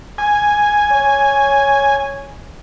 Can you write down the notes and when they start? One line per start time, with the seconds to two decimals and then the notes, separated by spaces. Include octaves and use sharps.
0.18 G#5
0.92 C#5